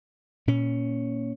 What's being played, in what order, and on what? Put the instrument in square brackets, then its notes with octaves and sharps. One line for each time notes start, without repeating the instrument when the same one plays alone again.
[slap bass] A#2 C#4